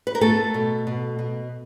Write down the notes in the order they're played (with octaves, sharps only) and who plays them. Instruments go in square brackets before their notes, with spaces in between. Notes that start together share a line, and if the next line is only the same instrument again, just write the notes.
[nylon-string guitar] B4
A#4
A3 B3 A4
B2
B2
B2